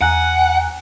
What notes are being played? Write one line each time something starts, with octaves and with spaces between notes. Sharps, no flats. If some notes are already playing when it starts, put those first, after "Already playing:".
E2 F#5 G#5 A#5 F#6